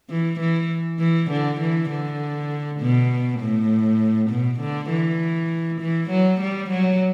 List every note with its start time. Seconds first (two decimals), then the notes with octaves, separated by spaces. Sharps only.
0.10 E3
0.40 E3
1.00 E3
1.30 D3
1.60 E3
1.90 D3
2.80 B2
3.40 A2
4.30 B2
4.60 D3
4.90 E3
5.80 E3
6.10 F#3
6.40 G3
6.70 F#3